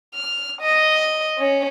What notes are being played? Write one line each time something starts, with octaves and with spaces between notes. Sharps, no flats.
F6
D#5
C#4